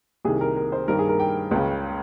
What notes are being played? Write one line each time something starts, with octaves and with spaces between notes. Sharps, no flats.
C2 C3 D#3 G#4
A#4
A#4
C5
G2 D#3 A#4
G#4
A#4
G5
C#2 C#3